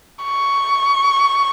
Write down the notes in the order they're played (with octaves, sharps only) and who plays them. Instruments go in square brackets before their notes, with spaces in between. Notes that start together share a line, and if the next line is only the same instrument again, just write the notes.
[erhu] C#6